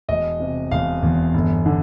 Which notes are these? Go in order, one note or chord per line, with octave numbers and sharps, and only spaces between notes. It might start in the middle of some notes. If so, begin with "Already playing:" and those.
E1 D#5
C3
E1 F5
E2
G1
D3